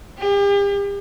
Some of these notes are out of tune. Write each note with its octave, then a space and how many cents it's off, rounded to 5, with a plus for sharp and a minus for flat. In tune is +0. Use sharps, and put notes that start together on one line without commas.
G4 +40